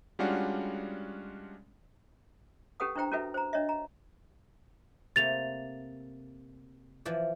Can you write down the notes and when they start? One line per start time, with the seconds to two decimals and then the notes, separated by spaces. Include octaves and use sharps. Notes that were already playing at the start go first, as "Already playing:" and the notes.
0.19 G3 G#3 C#4 D4 F4 F#4
2.80 C#4 G4 A4 B4 F#5 D#6
2.96 D4 E4 C5 G5 A#5
3.11 C#4 E4 F#4 A4 B4 E5
3.34 C5 A#5
3.53 D4 C#5 D#5 E5
3.69 A#5
5.16 C3 A3 A#3 A6 F7
7.05 E3 F3 D5